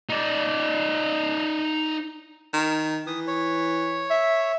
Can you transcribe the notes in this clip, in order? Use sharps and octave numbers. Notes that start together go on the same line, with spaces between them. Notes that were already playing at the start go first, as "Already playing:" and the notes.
D#4 D5
D#3
E3 D#6
C#5
E5